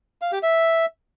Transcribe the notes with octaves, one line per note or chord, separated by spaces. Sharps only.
F5
G4
E5